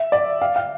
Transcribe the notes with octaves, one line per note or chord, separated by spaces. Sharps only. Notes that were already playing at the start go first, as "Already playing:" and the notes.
Already playing: E5
D5
F5
F5